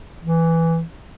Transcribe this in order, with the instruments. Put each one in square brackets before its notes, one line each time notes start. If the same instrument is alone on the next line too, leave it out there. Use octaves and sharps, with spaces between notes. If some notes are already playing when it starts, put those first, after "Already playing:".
[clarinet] E3